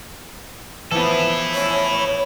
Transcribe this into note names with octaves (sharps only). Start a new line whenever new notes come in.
E3 F3 B3 E4 A4
C#5